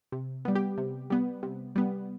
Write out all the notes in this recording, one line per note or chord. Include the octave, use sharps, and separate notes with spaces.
C3
G3 B3
G4
C3
G3 B3
C3
G3 B3